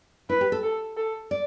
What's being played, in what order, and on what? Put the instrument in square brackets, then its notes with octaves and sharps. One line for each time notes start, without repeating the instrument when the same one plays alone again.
[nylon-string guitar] E4 [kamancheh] B4
[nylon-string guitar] G4
A4
[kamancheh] A4
A4
[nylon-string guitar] D5